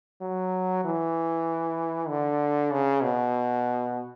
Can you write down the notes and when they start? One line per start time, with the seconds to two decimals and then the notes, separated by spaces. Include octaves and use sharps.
0.21 F#3
0.84 E3
2.09 D3
2.72 C#3
3.03 B2